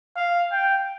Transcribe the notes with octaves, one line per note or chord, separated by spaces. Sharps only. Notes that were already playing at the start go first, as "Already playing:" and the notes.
F5
G5